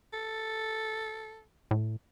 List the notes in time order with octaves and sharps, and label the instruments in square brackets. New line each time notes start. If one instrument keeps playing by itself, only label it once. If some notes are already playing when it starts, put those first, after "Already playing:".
[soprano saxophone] A4
[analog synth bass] A2